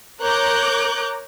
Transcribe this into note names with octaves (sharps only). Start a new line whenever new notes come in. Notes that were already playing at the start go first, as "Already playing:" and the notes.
A#4 C#5 A#5 D6 F#6 G6